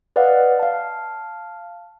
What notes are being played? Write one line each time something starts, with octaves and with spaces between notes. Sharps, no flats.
B4 D5 D#5 F5 F#5
F5 A5